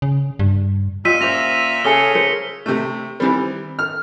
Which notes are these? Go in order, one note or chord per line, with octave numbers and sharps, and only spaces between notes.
C#3
G2
A#2 F4 G4 D#5 E6 B6 D#7
A#2 C#4 G4 C5 E5 A#6 F7
C#3 G#4 A4 G#5 C#7 G7
G#4 A#4 C5 C#7
C3 A3
D#3 E3 G3 C4
F6